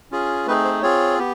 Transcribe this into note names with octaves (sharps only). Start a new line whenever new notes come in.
C#4 F4 G#4
A3 C4 D#4 G#4 B4
C5
C4 F4 G#4 C#5
B3 G4